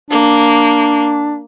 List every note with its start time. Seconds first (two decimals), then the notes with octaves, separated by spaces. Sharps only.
0.10 A#3 D4